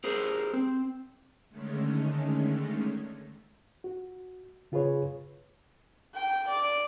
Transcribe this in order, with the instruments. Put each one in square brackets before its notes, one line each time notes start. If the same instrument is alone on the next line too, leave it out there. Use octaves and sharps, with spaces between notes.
[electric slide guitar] G4 G#4 A#4 C5
C4
[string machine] D3 D#3 G#3 A3 C#4
[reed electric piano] F#4
C#3 F4 G#4 B4 C#5
[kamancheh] G5
D5